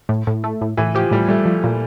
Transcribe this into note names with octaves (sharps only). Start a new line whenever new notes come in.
A2
A2
A3
A2
A2 E3
F3 G4
A2 G3
G3 A3
F3
A#2